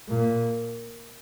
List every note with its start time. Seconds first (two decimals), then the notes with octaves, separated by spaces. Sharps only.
0.08 A#2